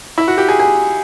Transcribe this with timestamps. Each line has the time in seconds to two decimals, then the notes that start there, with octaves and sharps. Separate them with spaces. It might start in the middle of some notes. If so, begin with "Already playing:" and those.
0.18 E4
0.28 F#4
0.38 G4
0.49 G#4
0.60 G#4